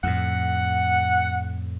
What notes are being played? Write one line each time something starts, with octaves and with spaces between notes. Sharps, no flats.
F2 A2 F#5